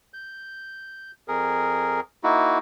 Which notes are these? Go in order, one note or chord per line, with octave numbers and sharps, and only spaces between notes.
G6
F2 G#4 A#4
A#3 D#4 E4 F#4